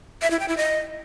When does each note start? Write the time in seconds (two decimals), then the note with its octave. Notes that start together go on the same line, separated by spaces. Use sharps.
0.22 E5
0.31 E4
0.39 G5
0.48 E4
0.57 D#5